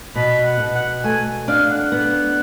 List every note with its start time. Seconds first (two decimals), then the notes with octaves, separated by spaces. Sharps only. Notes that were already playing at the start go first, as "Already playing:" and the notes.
0.15 B2 B4
0.45 F#5
0.60 B2
0.75 F#5
1.04 A3 G#5
1.48 D4 F5
1.71 F#5
1.92 B3